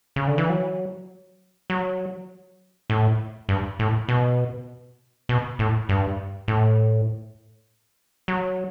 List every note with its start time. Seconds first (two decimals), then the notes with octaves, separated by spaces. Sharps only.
0.16 C#3
0.27 D3
0.38 E3
0.50 F#3
1.70 F#3
2.90 A2
3.49 G2
3.79 A2
4.09 B2
5.29 B2
5.59 A2
5.89 G2
6.48 A2
8.28 F#3